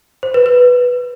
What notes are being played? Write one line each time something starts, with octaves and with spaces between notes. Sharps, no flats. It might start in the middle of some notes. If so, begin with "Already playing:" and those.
C5
B4
B4